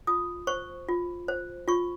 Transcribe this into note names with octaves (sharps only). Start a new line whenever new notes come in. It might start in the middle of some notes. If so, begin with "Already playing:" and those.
F4 D#6
C5 C#6
F4
C5
F4 C#6